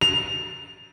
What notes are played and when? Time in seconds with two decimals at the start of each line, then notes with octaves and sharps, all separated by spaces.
0.01 F7